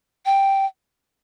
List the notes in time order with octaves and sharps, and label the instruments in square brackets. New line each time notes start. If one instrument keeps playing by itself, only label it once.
[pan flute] G5